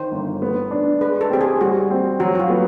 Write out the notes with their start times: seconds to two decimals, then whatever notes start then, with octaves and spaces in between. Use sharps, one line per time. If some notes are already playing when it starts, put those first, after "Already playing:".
Already playing: D#3 C5
0.12 G1
0.42 B3
0.71 D4
1.01 G#3 B4
1.21 A4
1.30 C4 G4
1.41 G#4
1.61 G3 F#4
1.91 C4
2.20 F#3 F#4
2.35 F#4
2.40 F4
2.50 B3